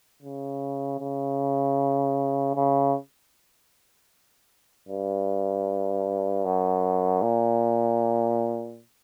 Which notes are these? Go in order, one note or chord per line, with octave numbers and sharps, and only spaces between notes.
C#3
C#3
C#3
G2
F#2
A#2